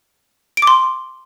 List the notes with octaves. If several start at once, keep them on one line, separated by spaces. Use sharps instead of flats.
D7
D6
C6